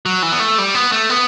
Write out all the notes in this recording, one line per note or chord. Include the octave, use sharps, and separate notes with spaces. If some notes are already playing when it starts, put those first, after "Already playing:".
F#3
E3
B3
A3
G3
B3
A3
B3